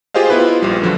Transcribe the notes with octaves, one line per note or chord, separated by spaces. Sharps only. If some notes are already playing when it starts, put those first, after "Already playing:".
F4 G4 G#4 C5 D#5 F5
B3 E4 F4 B4
A#1 G3
D3 F3 F#3